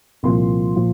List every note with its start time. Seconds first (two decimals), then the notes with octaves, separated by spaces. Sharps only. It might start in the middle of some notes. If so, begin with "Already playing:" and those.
0.23 C2 A#2 F3 C6
0.76 A#2 F3